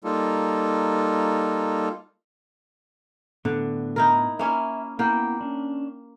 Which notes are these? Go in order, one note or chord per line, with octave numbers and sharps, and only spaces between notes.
G3 A#3 D#4 F4 A4
A2 D3 B3 D4
D#4 E4 A#4
A#3 C#4 E4 E5
A#3 B3 E4 F#5 G5
C#4 D4